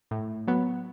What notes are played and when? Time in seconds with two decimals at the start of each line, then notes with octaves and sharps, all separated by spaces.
0.11 A2
0.47 F#3 B3